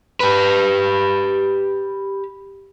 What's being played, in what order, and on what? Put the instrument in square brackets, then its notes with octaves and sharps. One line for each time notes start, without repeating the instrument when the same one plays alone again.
[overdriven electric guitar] G4 B4